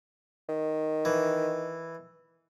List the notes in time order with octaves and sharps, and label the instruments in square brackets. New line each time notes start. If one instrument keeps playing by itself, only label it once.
[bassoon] D#3
[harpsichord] E3